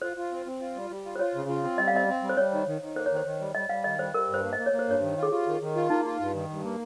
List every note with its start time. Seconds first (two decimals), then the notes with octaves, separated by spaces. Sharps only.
0.02 F4 C5
0.17 F4
0.31 C4
0.46 C4
0.61 F4
0.76 G3
0.90 G3
1.05 F4
1.16 C5
1.19 F4 C#5
1.35 C#3
1.49 F4
1.64 C4
1.78 G3 D#5
1.87 F5
1.93 C4 D#5
2.08 C4
2.23 G3
2.29 C5
2.37 G3 C#5
2.52 D#3
2.67 D#3
2.82 D#3
2.96 A#3 C5
3.06 C#5
3.11 D#3
3.16 C5
3.26 D#3
3.41 G3
3.55 G3 D#5
3.69 G3 F5
3.84 D#3 D#5
3.99 G3 C5
4.14 G3 A#4
4.29 G2
4.34 C5
4.44 A#3
4.53 D#5
4.58 A#3
4.66 C#5
4.73 A#3
4.79 C5
4.88 G2 C#5
5.02 D#3
5.17 F4
5.23 G#4
5.32 F4 G4
5.47 D#3
5.61 D#3
5.76 F4
5.90 A#3 D#4
6.05 F4
6.20 G2
6.35 D#3
6.49 G2
6.64 A#3